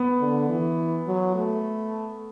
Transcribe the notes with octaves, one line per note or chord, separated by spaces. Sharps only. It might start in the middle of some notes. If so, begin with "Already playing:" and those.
Already playing: B3
D3
E3
F#3
A3